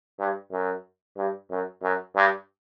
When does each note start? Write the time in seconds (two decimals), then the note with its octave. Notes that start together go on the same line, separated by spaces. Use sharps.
0.19 G2
0.52 F#2
1.17 G2
1.51 F#2
1.83 F#2
2.16 G2